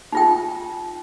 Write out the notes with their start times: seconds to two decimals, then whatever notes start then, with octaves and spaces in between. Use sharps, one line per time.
0.13 D#4 F4 G5